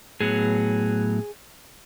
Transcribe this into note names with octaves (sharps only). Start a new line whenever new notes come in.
A2 F#3 B3 G#4